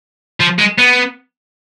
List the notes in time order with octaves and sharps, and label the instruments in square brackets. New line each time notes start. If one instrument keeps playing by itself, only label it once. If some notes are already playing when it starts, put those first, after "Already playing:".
[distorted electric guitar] F3
G#3
B3